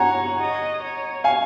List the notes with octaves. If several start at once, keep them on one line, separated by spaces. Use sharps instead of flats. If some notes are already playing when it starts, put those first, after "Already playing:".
Already playing: C#5 F#5 G#5 A#5
D#5
C#5
F5 G#5